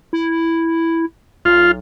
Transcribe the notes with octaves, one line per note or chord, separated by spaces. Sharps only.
E4
B1 F4